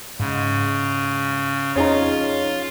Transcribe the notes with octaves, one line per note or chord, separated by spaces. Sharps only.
G#2 C#3
F2 C#4 D#4 F4 G#4 C#5 A#5